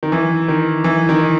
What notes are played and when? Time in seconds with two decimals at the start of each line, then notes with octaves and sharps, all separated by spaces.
0.03 D#3
0.12 E3
0.48 D#3
0.84 E3
1.09 D#3